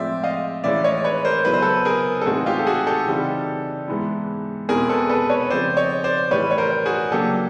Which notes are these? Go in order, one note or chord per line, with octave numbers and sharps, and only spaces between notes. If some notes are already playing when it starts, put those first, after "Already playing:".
Already playing: A2 F3 G#3 C4 D5 E5
D#5 F5
A2 E3 G#3 C#4 D5 E5
C#5 D#5
B4 C#5
A#4 C5
E2 C#3 F#3 B3 E4 B4
C5
A4 B4
G#4 A#4
A4
A2 E3 G#3 C4 D#4 F#4 G#4
F4 G4
A4
F#4 G#4
G4 A4
C#3 E3 G3 C4 D#4
G#2 E3 G#3 B3 E4
E2 B2 G#3 C4 E4 G#4 A#4
A4 B4
A4 B4
B4 C#5
C#3 F3 A3 C4 C5 D5
C#5 D#5
C5 D5
A2 E3 G3 B4 C#5
C#5
A#4 C5
F#4 G#4
C#3 F#3 A#3 D4 G4 A4